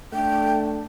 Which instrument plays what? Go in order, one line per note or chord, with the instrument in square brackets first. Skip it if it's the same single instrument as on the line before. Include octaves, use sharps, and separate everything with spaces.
[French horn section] A3 D4 [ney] G5